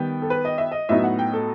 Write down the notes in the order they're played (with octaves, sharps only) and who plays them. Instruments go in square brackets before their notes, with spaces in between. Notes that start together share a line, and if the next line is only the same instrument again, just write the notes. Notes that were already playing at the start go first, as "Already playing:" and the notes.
Already playing: [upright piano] D#3 G3 B3 G5
A4
B4
D#5
E5
D#5
A2 F#3 B3 D#4 E5
F#5
G5
A4